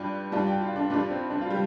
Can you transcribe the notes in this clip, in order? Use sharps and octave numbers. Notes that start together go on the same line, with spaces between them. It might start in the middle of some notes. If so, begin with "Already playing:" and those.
Already playing: G2 G3 F4 D5 G5
G2 G3 F4 D5 A5
G5
F4
D4
G2 G3 D4 F4 D5
C4
D4
F4
G3